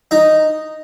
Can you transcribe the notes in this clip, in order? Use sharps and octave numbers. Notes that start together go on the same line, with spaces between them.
D#4